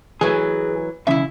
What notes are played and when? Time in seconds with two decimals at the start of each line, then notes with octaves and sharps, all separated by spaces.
0.21 E3 F#3 A3 G#4
1.07 B1 E2 C#3 E4 E5